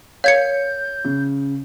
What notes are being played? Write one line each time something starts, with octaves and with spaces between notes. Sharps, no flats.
A#4 C#5 F5 G6 G#6 C#7
C#3